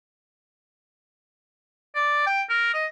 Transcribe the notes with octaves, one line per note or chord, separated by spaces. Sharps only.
D5
G5
A#4
D#5